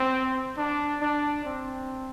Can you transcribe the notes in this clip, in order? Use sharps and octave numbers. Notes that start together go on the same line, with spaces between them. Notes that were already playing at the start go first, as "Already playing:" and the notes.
Already playing: C4
D4
D4
C4